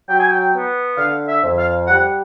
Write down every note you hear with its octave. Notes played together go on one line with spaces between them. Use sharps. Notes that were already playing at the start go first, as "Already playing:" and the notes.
F#3 G5
G#5
G5
B3
D3 F5
E5
F2
F5
G3 F#5